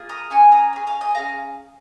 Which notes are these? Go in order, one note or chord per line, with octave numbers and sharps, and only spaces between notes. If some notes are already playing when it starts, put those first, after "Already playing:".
Already playing: A#3 F4 G#4
A#5 D#6
A#3 C#4 G#4 G#5 C#6
A#5 D#6
C#4 G#4
F5 A#5
D#5 G#5
C#4 G#4 F5 A#5